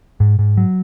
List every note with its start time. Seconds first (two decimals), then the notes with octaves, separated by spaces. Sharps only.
0.20 G#2
0.39 G#2
0.57 F#3